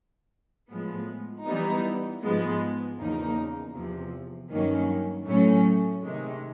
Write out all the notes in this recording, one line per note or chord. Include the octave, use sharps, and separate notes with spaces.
A2 F3 G#3 B3
E3 G3 B3 D#4
G#2 F3 G#3 B3
E2 C#3 F3 A#3 D#4
E2 C3 F3
G2 D#3 F#3 A#3 C#4
A2 F#3 A3 C#4
C3 D#3 G#3